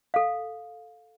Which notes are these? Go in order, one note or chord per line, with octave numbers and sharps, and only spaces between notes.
A4 F5